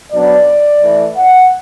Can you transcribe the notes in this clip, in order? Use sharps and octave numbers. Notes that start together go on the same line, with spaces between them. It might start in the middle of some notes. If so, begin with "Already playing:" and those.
B2 F#3 B3 D4 D5
E3 A3 E4
F#5